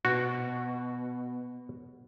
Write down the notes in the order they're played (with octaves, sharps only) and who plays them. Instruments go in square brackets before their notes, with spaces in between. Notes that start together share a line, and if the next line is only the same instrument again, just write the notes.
[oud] B2 [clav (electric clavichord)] F#4